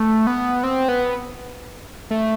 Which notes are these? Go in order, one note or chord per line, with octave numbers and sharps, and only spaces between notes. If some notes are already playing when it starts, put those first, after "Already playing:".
Already playing: A3
B3
C4
B3
A3